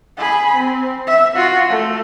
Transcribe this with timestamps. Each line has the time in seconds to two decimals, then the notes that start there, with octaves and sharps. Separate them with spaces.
0.18 G#4 B5
0.55 C4
1.07 E5
1.36 F4 F#4
1.69 A3